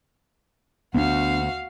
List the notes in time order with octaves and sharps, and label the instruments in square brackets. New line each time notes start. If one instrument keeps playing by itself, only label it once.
[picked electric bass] D2 [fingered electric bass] B3 D4 [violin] F#4 F5